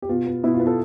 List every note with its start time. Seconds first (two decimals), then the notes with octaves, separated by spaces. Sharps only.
0.02 G4
0.09 B2 F4
0.27 B3
0.44 B2 E4
0.54 F4
0.60 B3
0.65 F4 A4